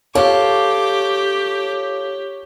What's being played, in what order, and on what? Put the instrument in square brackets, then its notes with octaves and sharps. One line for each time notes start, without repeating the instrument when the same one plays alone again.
[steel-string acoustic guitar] F4 A4 [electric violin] G4 [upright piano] C#5 [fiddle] D6